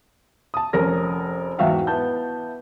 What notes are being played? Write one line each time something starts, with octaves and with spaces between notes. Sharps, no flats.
A5 D#6
F1 C#4 A#4 A#6
E2 G#2 F#4 E5 F5 G5
B3 E4 A5 G6